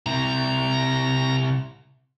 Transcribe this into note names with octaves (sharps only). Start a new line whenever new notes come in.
C3 E4 A#5